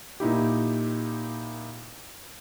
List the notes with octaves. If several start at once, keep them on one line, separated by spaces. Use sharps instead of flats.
A#2 D#4 E4 G4